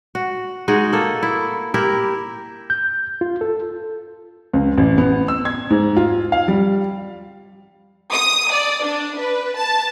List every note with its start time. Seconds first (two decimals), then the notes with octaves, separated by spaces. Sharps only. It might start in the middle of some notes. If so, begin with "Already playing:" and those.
0.15 F#4
0.68 G#3 D#4 F#4 G#4
0.93 A#3 A4
1.23 E4
1.74 E4 G4 A#4
2.70 G6
3.21 F4
3.41 A4
4.53 C#2
4.78 A1
4.98 B3
5.28 E6
5.45 G#6
5.70 G#2
5.97 F4
6.32 F5
6.48 G3
8.11 D#6
8.52 D5
8.83 D4
9.17 B4
9.57 A5